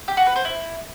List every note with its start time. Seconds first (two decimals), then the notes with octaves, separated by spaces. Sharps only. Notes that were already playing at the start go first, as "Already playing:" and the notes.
0.08 G4
0.17 F#4
0.26 B4
0.36 C5
0.45 E4